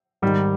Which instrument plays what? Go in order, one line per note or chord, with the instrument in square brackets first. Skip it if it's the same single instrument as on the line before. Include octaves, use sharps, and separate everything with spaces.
[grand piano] G#2 D#3 G3